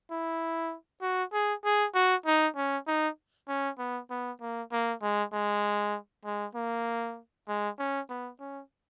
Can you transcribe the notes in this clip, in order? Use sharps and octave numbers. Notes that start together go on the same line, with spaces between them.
E4
F#4
G#4
G#4
F#4
D#4
C#4
D#4
C#4
B3
B3
A#3
A#3
G#3
G#3
G#3
A#3
G#3
C#4
B3
C#4